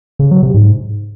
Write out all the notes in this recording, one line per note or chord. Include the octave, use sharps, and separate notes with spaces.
C#3
F#3
C3
G#2